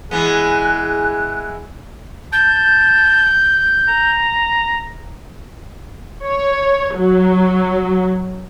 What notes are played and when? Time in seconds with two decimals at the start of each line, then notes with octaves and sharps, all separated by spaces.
0.11 E3 G#3 B3 G#4 F#6
2.33 A5 G6
3.88 A#5
6.24 C#5
6.96 F#3